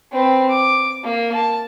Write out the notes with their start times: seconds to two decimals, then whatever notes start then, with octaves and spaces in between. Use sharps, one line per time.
0.12 C4 B4
0.49 D6
1.04 A#3
1.34 A5